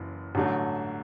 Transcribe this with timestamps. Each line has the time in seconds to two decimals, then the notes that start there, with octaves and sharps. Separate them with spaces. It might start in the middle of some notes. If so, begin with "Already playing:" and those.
Already playing: F#1 F#2 E3
0.35 A1 G2 D3 F#3 A3